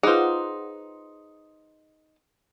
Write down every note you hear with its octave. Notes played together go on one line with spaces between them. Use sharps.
D#4 F4 G#4 B4 C5 F#5